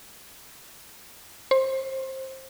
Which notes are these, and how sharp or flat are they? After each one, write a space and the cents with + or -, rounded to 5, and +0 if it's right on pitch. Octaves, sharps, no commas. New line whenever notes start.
C5 +20